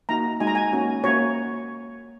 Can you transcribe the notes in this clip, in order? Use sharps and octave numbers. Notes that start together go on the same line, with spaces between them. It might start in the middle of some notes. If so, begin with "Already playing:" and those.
A#3 D#4 F#4 A#5
G#3 D#4 F#4 G#5
A#5
G#5
A#3 C#4 F#4
A#3 C#4 F#4 C#5